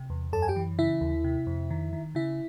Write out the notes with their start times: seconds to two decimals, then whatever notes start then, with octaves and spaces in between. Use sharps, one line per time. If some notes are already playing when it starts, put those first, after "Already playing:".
Already playing: C3
0.10 E2
0.33 F#2 A4 A5
0.42 G#5
0.48 G4 G5
0.56 E3
0.78 C#3 E4 E5
1.01 D#2
1.24 C3
1.47 F2
1.70 D#3
1.93 D#3
2.15 C#3 E4 E5